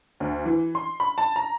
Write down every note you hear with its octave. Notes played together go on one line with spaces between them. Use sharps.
D2
E3
C6
B5
A5
A#5